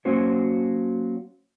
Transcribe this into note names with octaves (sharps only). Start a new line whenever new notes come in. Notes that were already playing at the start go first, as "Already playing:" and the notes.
F#3 A#3 C#4 F#4 C5 C#5